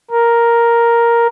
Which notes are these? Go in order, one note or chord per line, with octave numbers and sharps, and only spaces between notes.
A#4